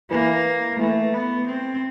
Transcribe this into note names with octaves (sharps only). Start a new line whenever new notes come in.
E3 A#3
E3 A3
B3
C4